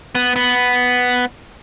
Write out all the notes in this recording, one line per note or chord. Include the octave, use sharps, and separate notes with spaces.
B3
B3